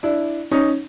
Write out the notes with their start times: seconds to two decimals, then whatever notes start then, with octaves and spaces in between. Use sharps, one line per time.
0.03 D4 E4
0.51 C#4 D#4